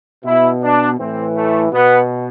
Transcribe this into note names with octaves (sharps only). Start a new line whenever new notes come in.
B2 E4
D4
A2 E3 C4
A3
B2 B3